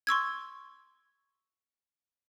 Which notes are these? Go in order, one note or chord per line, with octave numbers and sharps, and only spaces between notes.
C6 C#6 E6 G#6